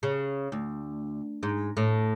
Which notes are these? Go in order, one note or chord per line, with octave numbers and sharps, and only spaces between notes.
C#3
D2
G#2
A2